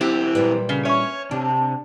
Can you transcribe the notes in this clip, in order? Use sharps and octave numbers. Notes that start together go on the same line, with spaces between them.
F#3 C4 E4 G4
A#2 E3 G3 B4
C#3 G7
C#4 C#5 E5 C#6
C3 D4